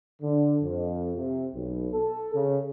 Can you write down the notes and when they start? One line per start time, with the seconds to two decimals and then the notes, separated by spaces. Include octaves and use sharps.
0.22 D3
0.63 F2
1.16 C3
1.55 B1
1.93 A4
2.34 C#3